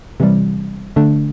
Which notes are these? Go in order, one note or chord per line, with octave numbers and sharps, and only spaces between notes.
C3 E3 G3
D3 A3 D4